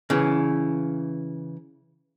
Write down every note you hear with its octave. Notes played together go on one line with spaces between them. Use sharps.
C#3 E3